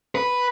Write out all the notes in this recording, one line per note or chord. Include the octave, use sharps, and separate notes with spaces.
B4